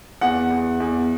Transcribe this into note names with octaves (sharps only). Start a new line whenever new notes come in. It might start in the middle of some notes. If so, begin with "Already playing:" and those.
E2 F#5
E2
E2